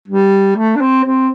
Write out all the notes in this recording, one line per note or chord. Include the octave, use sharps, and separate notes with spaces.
G3
A3
D4
C4
C4